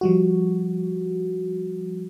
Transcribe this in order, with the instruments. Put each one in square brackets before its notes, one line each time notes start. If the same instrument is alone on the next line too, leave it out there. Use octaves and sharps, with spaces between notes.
[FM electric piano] F3 G3 F#4